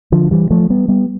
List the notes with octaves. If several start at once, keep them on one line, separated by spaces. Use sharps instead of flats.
D3 F3
E3 G3
F3 A3
G3 B3
G3 B3